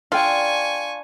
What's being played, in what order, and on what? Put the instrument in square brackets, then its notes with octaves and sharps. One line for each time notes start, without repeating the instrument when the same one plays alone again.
[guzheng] D4 [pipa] F4 [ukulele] A4 G5 [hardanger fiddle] G#5 C#6